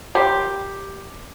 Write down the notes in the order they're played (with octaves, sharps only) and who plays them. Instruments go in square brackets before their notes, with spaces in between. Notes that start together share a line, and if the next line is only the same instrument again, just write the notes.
[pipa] D#3 G3 G4 C6